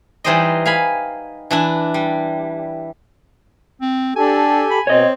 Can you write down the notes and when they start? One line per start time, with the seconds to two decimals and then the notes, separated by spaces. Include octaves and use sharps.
0.24 E3 G3 D#4 C5 D5 D#5
0.66 F5 G#5 B5
1.51 E3 D4 E4
1.94 G3
3.82 C4
4.16 D4 G4 A4 G#5
4.70 B5
4.87 B2 C4 C#5 D#5